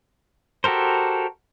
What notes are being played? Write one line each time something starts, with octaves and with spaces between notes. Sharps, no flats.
F#4 G4 A4 A#4 C5